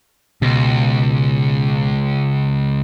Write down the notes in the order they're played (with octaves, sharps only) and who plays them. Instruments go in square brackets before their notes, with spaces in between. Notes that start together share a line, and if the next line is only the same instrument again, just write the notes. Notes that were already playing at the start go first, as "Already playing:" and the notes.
[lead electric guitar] C#2 [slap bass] B2